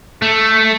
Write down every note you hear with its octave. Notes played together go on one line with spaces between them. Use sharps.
A3